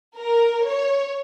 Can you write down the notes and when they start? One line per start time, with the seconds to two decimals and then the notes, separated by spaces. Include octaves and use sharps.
0.17 A#4
0.64 C#5